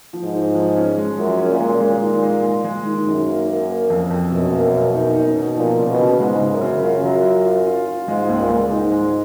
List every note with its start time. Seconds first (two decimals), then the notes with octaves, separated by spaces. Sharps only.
0.13 F3
0.23 G#2
0.34 D#4
0.55 F3
0.76 C#4
0.97 G#3
1.18 F#2 F3
1.39 C#4
1.49 A#2
1.60 G#3
1.80 A#2 G#3
2.02 D#3
2.22 G#3
2.44 G#3
2.64 G#3
2.85 D#3
3.06 F#2 D#3
3.27 A#3
3.48 A#3
3.69 A#3
3.90 F2
4.10 F2
4.31 F#2 B2
4.53 A#3
4.73 B2
4.94 D#4
5.15 D#4
5.36 B2
5.57 A#2 F3
5.78 C#3
5.89 B2
5.99 C#3
6.19 G#2 G#3
6.41 C#3
6.51 F#2
6.61 C#3
6.83 F#2 F4
7.04 F#3
7.24 F4
7.45 F4
7.66 F4
7.87 F4
8.07 G#2 G#3
8.30 C#2
8.39 A#2
8.50 G#3
8.71 G#2 D#4
8.92 G#3